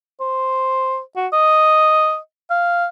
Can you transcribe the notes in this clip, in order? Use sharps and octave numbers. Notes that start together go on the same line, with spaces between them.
C5
F#4
D#5
F5